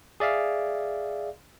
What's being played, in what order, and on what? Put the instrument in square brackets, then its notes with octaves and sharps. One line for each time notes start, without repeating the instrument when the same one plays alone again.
[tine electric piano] G#4 D5 E5 F5